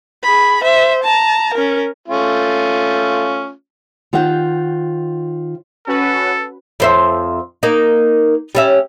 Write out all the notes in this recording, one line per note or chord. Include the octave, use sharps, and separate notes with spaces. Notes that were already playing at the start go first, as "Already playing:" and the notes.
G#4 B5
C5 E5
A5 A#5
C#4 A#4
A3 C#4 F4
D#3 F4 C5 D#5 F#5 G5
C#4 F#4 A4 B4
F2 C5 E5
A#3 D#4
G3 C#4 E5